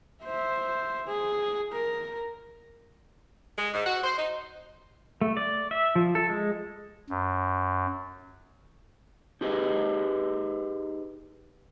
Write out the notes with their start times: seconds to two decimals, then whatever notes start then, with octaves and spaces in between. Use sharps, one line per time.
0.23 C5 E5
1.08 G#4
1.73 A#4
3.58 G#3
3.74 G#2
3.86 F#4
4.04 C5
4.18 D#4
5.21 A3
5.37 D5
5.71 E5
5.96 F3
6.15 A4
6.29 G#3
7.10 F#2
9.41 D#4 G4 G#4 B4 D#5